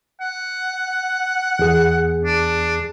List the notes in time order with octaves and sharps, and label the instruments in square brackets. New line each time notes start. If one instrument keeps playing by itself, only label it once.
[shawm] F#5
[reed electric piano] E2 G#4
[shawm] D4